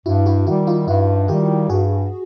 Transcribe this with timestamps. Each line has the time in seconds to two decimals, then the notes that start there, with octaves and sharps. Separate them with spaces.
0.06 G2 E4 F#4
0.26 E4 F#4
0.46 D#3 G3 E4 F#4
0.67 D#4 F4
0.88 G2 E4 F#4
1.28 D#3 G3 F4 G4
1.69 G2 F#4 G#4